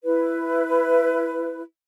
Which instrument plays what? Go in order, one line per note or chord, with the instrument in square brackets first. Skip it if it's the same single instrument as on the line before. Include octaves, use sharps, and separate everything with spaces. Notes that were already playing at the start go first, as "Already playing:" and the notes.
[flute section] E4 B4